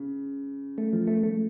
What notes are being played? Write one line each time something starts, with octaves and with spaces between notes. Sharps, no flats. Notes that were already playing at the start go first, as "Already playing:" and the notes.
Already playing: C#3
A3
F3
A3
A3